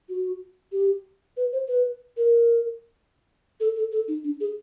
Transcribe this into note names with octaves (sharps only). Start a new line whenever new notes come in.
F#4
G4
B4
C5
B4
A#4
A4
A4
A4
D#4
D4
G#4